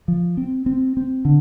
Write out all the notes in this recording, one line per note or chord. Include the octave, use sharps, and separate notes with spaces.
F3
C4
C4
C4
D3